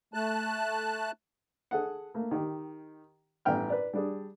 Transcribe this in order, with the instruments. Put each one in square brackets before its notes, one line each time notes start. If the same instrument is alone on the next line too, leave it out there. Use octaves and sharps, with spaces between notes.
[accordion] A3 A5 F#6
[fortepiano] G#4 A4 F#5
A3 A#3
D#3 G4
A1 G2 B3 G5 F6
B4 D5
G3 D4 G#4